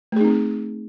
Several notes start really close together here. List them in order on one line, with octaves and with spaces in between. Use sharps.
A3 G#4 D#4 C4